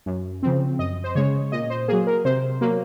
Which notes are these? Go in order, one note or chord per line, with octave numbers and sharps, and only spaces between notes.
F#2
C#3 F3 C4
F#2 D#5
C5
C#3 G#3 C#5
A#2 D#5
C5
F#3 A#3 G#4
A#4
C3 C5
F#3 A#3